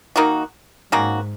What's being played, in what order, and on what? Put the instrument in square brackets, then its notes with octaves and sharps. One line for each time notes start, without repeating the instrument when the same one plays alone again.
[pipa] D#3 A#3 D#4 F#4
[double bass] G#2 [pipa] D#3 A#3 C#4 F#4